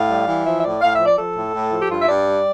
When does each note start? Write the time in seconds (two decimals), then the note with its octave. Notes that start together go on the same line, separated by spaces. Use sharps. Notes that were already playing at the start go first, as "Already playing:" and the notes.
Already playing: A2 F5
0.09 G3
0.28 E3
0.46 F3 E5
0.60 E5
0.63 A2 D5
0.82 A2 F5
0.94 E5
1.00 F3
1.06 D5
1.18 F3 A4
1.36 A2
1.54 A2
1.73 F3
1.82 G4
1.90 G2 F4
2.02 E5
2.08 G2 D5
2.27 G3